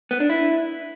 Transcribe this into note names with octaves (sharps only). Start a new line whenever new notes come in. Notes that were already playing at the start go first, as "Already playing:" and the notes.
B3
D4
E4